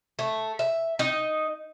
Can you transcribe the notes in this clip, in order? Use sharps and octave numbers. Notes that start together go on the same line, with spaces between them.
A3
E5
D#4